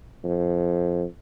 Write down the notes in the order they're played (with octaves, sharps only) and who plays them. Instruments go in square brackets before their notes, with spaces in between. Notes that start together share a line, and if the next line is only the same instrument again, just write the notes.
[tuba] F2